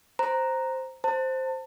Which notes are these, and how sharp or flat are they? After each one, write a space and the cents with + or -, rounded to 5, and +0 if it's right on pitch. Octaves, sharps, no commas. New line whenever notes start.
C5 +0 A#5 +0
C5 +0 A5 +30